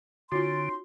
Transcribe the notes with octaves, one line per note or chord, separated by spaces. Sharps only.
D3 C#4 D#4 F4 F#4 C6